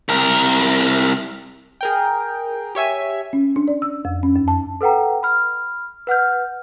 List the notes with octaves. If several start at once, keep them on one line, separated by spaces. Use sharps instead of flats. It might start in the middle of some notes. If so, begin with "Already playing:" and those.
C2 A#4
G#4 A#4 G5
G4 C#5 E5 G#5
C#4
D4
D5
E6
F2
C#4
F#2
A5
A4 B4 F#5 G5 A#5
B5 F6
B4 F#5 F6 G6